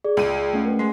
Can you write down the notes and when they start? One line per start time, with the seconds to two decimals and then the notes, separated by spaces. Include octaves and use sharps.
0.05 G#4 D5
0.17 C#2 D#7
0.53 A3 C#4 F#5
0.65 A#4 B4
0.79 G#3 C7